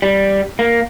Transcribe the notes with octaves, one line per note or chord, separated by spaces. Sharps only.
G3
A#3